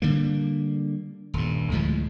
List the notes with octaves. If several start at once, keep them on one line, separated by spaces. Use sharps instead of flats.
D3 G3 A#3
D#1 G2
D2 A2 F3 G#3